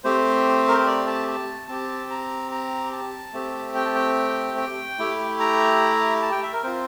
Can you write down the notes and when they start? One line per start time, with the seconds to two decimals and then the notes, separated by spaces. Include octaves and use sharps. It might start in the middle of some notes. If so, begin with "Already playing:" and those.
0.04 A3 C4 G4 C5
0.68 A#4
0.78 C5
0.86 D5
1.07 A5
1.28 A5
1.68 C4 G4 A5
2.10 A#5
2.51 A#5
2.93 A5
3.33 A3 C4 G4
3.75 G5
3.85 A5
3.95 G5
4.57 G5
4.99 A3 E4 G4
5.40 A#5
6.22 A5
6.32 G5
6.43 E5
6.53 A#4
6.63 C4 F4 C5